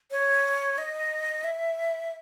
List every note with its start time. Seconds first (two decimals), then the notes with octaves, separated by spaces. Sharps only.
0.11 C#5
0.78 D#5
1.44 E5